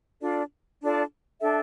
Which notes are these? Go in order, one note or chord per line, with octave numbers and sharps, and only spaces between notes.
D4 F4 A4 D5
D4 F4 A4 D5
D4 A4 E5 G5